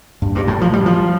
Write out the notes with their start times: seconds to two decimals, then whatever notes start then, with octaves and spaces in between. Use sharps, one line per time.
0.22 G2
0.35 G2
0.48 A2
0.61 F3
0.73 G3
0.86 F3